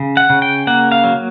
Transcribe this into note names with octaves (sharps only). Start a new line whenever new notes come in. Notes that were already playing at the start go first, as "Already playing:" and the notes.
Already playing: C#3
F#5
C#3
G5
A#3 F#5
F5
F#3